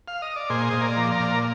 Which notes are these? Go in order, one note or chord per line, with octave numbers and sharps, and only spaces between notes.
F5
D#5
D5
A#2 G#4 C5
A#2 D#5
A#4 D5
F3
A#4 D5
A#2